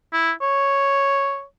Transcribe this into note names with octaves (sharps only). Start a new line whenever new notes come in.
E4
C#5